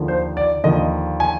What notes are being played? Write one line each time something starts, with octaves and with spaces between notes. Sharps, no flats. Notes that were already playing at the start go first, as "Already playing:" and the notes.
Already playing: D#2 D3 F3
C5
D5
D#2 D3 F3 D#5
G#5